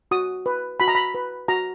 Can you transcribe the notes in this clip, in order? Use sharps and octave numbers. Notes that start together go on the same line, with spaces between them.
F#4 D#6
B4
F#4 B5
A#5
B5
B4
F#4 A#5